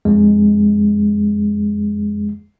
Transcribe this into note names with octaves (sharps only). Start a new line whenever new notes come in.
F2 G#3